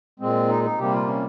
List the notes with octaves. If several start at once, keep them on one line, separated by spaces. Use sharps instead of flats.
A#2 G#3 C4
D#4
D#4
C3 G3 A#3 G4
F4
C#4